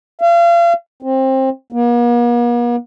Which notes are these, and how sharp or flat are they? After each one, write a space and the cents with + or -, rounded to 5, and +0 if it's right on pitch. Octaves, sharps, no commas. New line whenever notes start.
F5 -35
C4 +20
A#3 +45